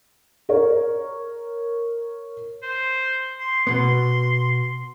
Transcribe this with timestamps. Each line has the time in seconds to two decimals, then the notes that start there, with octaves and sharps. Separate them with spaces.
0.49 A#4 C#5
2.63 C5
3.40 C6
3.67 B2 B3 C6